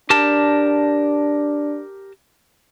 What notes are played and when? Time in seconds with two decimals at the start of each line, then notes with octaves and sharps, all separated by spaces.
0.10 D4 G4 A#4 A5